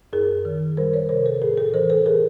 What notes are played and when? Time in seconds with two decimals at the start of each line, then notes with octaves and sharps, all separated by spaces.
0.13 F#2 G#4 A#4
0.45 D#3
0.77 G3 A#4 C5
0.93 B4 C#5
1.09 C3 A#4 C5
1.26 A4 B4
1.42 A2 G#4 A#4
1.58 A4 B4
1.74 E3 A#4 C5
1.90 A4 B4
2.06 G#4 A#4